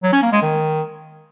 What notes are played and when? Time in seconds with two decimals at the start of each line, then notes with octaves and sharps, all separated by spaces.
0.03 F#3
0.13 C#4
0.22 A#3
0.32 G#3
0.42 D#3